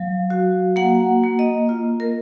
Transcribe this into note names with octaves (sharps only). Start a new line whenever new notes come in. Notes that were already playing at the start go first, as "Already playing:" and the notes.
Already playing: F#3 F5
F#4
A#3 F#5
A#3
D#5
F4
A#4